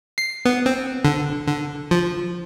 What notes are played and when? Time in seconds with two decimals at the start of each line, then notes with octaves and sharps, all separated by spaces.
0.18 C7
0.45 B3
0.66 C4
1.05 D3
1.47 D3
1.91 F3